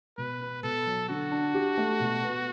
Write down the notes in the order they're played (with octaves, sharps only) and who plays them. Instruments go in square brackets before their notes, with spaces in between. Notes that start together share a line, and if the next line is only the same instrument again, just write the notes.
[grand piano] B2 [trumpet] B4
[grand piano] B3
[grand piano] B2 [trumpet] A4
[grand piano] F#3
[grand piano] D3 [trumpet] F#4
[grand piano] D4
G4
A3
B2
B3